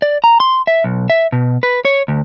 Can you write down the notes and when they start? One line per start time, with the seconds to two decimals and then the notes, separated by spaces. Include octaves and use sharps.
0.02 D5
0.24 A#5
0.40 C6
0.67 E5
0.84 B1
1.10 E5
1.32 B2
1.63 B4
1.85 C#5
2.08 D2